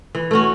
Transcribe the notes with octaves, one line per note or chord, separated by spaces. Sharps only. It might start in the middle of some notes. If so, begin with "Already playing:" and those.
E3
A3 C#4 F#4